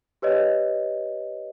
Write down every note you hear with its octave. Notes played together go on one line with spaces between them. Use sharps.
G4 B4 C#5 D#5